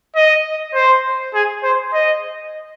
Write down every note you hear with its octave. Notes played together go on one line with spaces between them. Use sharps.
D#5
C5
G#4
C5
D#5